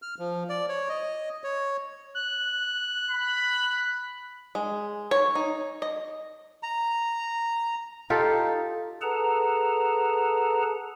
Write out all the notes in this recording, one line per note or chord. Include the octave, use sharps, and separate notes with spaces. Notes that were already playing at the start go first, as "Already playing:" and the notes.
F6
F3
D5
C#5
D#5
C#5
F#6
B5
G#3
C#5
D#4
D#5
A#5
D#4 F4 G4 A4
G#4 A4 B4 F#5 A5 A#5